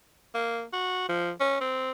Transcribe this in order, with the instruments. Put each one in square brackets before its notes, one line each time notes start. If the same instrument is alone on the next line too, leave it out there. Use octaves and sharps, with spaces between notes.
[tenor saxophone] A#3
F#4
F3
C#4
C4